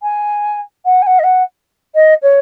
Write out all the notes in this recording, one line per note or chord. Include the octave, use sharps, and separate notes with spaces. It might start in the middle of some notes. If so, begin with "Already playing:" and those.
G#5
F#5
G#5
F#5
D#5
F#5
D#5
C#5